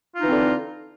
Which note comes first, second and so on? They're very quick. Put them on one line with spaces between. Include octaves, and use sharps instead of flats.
F4 D#4 E3 C4 D3